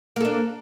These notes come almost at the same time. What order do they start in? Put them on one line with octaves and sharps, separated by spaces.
A#3 A4 D4